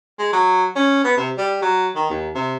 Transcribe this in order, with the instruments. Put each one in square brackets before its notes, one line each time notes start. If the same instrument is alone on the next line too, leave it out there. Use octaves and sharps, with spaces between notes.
[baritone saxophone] G#3
F#3
C#4
B3
C3
G3
F#3
D#3
D#2
C3